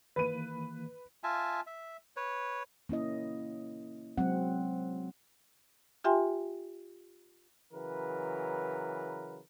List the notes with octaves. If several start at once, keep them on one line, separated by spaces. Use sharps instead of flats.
D#3 E3 A#3 B4 D#7
F4 E5 G#5 A5
E5
B4 C#5
A#3 C#4 E4 D#5
F#3 G#3 C4 F#5
F4 G4 E5 G5 G#5 C6
C#3 E3 F#3 A#4 B4